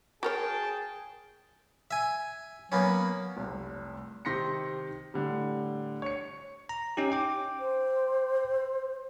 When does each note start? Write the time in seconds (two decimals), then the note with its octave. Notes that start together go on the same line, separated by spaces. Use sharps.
0.23 F#4 G#4 A#4 C#5 G5 A5
1.91 E5 G#5
2.72 F#3 A#3 B3 C#4
3.37 F1 C2
4.25 C3 D#3 C6 A#6 B6 C#7
5.14 A2 D3 G3
6.02 C#5 C#7
6.69 A#5
6.97 C#4 D#4 G4
7.12 G5 D6
7.60 C5